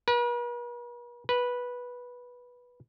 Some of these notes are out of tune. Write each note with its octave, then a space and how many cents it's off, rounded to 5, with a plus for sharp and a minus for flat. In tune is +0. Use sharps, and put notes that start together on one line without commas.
B4 -45
B4 -10